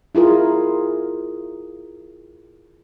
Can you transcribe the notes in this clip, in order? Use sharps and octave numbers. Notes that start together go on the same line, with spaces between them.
E4 F4 G#4 A#4